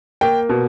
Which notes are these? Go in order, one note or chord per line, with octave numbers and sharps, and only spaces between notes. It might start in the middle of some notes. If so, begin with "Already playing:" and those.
A#3 G5
B2